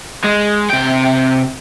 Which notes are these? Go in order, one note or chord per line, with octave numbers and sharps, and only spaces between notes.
G#3
C3 G5